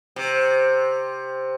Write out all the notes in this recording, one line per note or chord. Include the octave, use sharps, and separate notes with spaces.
C3